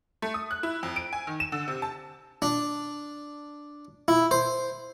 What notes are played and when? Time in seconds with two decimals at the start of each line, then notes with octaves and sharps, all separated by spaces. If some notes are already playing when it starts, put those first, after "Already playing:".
0.22 A3
0.34 D#6
0.51 F#6
0.63 E4
0.83 F2
0.96 D7
1.13 G#5
1.27 D#3
1.40 E7
1.52 D3
1.68 C3
1.82 A5
2.42 D4
4.08 E4
4.31 C5